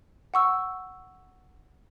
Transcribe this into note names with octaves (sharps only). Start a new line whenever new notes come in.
F#5 C#6 E6